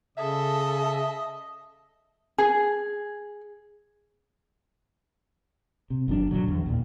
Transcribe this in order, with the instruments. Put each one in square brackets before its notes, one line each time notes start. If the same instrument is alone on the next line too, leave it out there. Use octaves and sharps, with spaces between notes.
[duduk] C#3 [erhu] A4 [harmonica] D#5 [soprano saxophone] E5
[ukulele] G#4
[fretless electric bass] C3
G1 D#3 F#3 D4
E1 A2 D3 F#3
E2
D#2 A#2 D#3